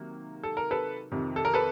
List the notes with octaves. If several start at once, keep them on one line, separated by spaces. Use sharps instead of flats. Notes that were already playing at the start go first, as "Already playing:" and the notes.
Already playing: C3 D#3 F#3 A#3
A4
A#4
A4 B4
F2 C3 D#3
A4
A#4
A4 B4